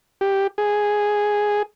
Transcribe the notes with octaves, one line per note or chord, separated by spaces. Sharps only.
G4
G#4